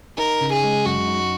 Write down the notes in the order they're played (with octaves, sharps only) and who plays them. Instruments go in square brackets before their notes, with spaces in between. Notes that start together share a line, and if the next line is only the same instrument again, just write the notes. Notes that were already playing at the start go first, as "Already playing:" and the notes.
[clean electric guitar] D#4 [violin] A#4
[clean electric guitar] C#3
[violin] G#4
[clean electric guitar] G#3
[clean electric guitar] F#2 [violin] F#4
[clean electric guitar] D#4